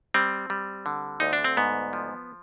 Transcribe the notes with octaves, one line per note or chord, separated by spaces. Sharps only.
G3 C4
G3
D3
D2 D#4
D4
C4
G#2 B3
F3